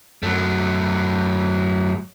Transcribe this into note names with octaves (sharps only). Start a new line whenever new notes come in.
F#2 F#3 A3